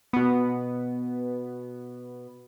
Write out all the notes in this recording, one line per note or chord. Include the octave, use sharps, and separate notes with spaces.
B2 B3